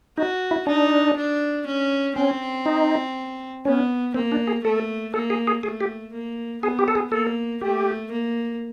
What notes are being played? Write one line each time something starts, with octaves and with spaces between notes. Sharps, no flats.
D#4 F#4
E4
D4 D#4
D4
C#4
C4 C#4
D#4
B3 C#4
A#3 C4
D4
G#4
A3 A4
A#3 A4
G#4
G#4
A3 G#4
G4
A#3
B3 G#4
G4
A4
G#4
A#3 A4
A3 G4
A#3